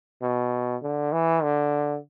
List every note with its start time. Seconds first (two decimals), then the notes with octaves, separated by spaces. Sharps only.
0.22 B2
0.82 D3
1.12 E3
1.43 D3